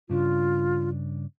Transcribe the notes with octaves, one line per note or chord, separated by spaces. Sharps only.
G2 C#3 D4 F4